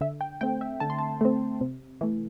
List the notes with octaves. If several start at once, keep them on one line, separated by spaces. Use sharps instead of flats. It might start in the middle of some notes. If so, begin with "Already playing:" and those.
D3 E5
G5
A3 C4 G5
E5
D3 A5
C6
A5
A3 C4
C3
E3 A3